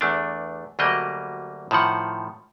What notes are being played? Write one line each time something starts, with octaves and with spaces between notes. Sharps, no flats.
E2 A3 D4
D2 F#3 G3 A#3 D#5
A2 D#3 F3 F#5